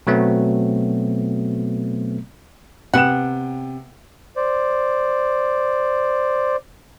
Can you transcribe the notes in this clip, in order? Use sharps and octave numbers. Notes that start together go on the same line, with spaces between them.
B2 F#3 A3 B3 C4
C3 B3 F#5 G5 E7
C5 D5